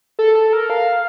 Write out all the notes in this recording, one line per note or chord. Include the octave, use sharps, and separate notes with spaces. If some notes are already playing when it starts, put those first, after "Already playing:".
A4
A4
A#4
F5